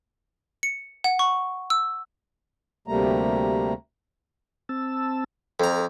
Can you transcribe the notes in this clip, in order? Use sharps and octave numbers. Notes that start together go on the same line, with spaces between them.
C#7
F#5
C#6
E6
D2 C3 G3 A3 A#3 A#5
C4 A5 E6
F2 A4 A#5